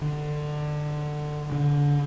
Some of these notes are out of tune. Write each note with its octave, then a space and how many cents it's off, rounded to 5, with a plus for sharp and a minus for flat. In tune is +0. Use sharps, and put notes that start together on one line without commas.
D3 +20
D3 -25